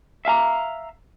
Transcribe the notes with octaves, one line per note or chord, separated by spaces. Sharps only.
E5 F5 G#5 A#5